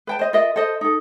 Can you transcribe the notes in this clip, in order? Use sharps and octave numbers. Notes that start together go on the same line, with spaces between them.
B4 G5 A5
C5 D#5
F4 A#4 D#5 E5
A4 C5 D#5
D#4 A4